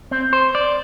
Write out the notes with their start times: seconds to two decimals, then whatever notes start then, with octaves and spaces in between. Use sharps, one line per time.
0.11 C4
0.33 C5
0.55 D5